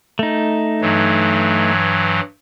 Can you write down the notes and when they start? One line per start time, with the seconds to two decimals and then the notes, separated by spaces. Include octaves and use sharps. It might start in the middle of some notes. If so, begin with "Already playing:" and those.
0.19 A3 D#4
0.81 G2 E3 F#3